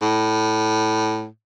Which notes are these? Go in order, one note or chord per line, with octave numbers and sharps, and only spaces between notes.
A2